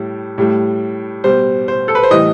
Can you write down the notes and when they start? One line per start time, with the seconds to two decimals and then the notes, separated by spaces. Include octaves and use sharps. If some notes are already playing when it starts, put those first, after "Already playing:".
Already playing: A2 G3
0.38 A2 G3
1.24 B2 G3 C5
1.68 C5
1.88 A4
1.95 B4
2.03 C5
2.11 A2 E3 G3 D#5